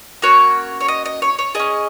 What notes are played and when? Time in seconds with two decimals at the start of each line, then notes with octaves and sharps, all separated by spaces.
0.22 A#3 C#4 F#4 C#5
0.81 C#5
0.88 D#5
1.06 D#5
1.22 C#5
1.39 C#5
1.55 C#4 G#4 D#5